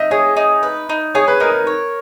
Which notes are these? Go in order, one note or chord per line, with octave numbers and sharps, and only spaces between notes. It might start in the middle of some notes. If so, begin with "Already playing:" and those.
Already playing: D#4 D#5 E5
G#4 C#5
D#4
B4
D#4
G#4 C#5
B4
D#4 A#4
A#4
C#5